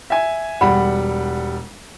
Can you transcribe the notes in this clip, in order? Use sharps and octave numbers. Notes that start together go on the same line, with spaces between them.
E5 G#5
E1 G3 F#5 B5